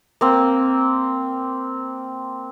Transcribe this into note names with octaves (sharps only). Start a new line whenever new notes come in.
A#3 C4